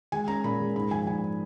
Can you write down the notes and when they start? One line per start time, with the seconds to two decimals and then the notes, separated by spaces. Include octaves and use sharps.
0.12 G#3 G#5
0.28 C#4 A#5
0.44 A#2 B5
0.60 G#3
0.75 G#2 B5
0.91 F3 G#5
1.07 G#2 G#5